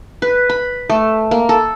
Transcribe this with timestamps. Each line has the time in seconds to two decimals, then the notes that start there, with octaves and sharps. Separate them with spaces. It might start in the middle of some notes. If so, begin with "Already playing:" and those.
0.22 B4
0.50 B5
0.90 A3
1.31 A#3
1.49 A4